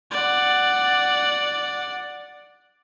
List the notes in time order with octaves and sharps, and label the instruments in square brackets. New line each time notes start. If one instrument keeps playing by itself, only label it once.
[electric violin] D5 F#5